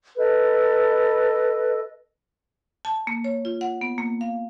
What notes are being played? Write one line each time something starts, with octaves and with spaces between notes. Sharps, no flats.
A4 B4 D#5
A5
A#3
C#5
F4
F#5
B3
A#3
F5